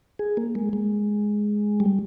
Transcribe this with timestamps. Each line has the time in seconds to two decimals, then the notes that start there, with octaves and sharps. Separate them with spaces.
0.19 G#4
0.37 A#3
0.55 G#3
0.73 G#3
1.80 G3